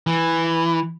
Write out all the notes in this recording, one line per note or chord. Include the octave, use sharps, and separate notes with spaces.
E3